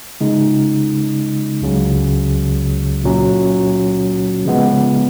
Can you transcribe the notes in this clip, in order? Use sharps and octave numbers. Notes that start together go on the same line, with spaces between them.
C#3 G#3 D#4
C#2 C#3 F#3 C#4
A#2 F#3 C#4
C#3 F3 G#3 B3